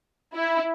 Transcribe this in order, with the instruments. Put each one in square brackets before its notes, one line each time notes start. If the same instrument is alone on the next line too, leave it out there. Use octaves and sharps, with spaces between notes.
[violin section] E4